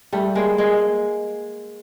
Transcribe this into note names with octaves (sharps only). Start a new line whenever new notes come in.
G3 A3
G#3 A#3
G#3 A#3